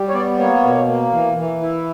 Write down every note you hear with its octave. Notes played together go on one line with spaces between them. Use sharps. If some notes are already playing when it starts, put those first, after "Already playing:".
Already playing: G3
C#5
B3 D5
A#3 C#5
B2
A#3
E3
E3
E4